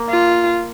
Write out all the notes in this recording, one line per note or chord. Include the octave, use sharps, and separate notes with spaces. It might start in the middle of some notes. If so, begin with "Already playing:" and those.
Already playing: A#3
F4